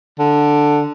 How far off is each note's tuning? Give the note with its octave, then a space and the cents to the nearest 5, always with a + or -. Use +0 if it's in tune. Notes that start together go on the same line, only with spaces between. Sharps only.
D3 +5